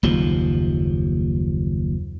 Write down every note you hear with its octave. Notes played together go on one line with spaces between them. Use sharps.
F#1 D#2 F3